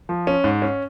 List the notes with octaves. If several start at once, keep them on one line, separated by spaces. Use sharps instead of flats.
F3
C#4
G#2
C#4